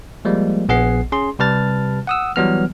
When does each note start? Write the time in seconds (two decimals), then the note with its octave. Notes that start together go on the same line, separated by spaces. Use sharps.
0.25 F3 G3 G#3 A#3
0.69 A#1 B3 G#4 F#5 C7
1.12 C#4 G#4 C6
1.39 C3 G3 B4 A5 F6 A6
2.07 F#5 D#6 E6
2.36 E3 F#3 G3 B3 F6